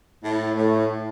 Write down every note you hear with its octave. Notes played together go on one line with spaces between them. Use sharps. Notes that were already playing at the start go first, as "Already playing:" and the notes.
A2
A2